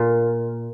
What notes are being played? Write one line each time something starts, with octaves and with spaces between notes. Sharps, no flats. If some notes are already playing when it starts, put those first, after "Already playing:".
Already playing: A#2